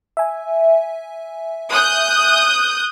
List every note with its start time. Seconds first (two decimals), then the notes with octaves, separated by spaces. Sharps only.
0.17 E5 G#5
1.71 D#6 F#6 G6